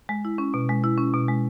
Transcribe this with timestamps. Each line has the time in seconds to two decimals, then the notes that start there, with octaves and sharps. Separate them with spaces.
0.09 G#3
0.25 E4
0.38 C#4
0.54 B2
0.69 G#3
0.84 E4
0.98 C#4
1.14 B2
1.28 G#3